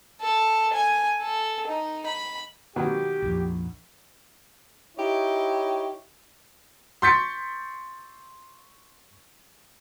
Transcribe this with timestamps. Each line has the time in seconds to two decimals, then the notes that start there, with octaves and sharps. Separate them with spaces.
0.21 A4
0.74 G#5
1.21 A4
1.67 D#4
2.07 B5
2.76 B2 D#3 F#3 G4
3.22 A#1 F2
4.98 D#4 E4 G4 C#5
7.02 C6 C#6 G6 A6 B6 C#7